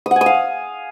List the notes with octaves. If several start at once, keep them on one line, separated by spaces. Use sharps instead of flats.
D#6
F#5
G#5
D#6
F5